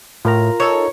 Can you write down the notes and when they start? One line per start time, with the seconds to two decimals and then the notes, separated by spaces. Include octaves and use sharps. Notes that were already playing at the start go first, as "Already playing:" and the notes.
0.25 A2 F4 A#4 A#5
0.60 D#4 A4 C#5